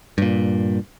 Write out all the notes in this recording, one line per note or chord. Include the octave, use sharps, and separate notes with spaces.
G2 A#2